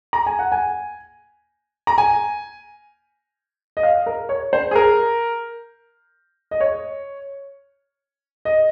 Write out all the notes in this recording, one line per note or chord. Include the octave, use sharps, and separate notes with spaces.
A#5
G#5
F#5
G#5
A#5
G#5
D#5
F5
A#4
C#5
C5
G#4
A#4
D#5
C#5
D#5